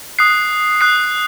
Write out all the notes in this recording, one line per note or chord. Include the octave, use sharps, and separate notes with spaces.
D#6 F#6 C7
D#6 F#6 C7